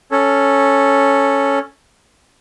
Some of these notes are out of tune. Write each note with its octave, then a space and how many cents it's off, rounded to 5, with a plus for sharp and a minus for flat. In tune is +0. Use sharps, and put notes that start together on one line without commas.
C#4 +0 A4 +0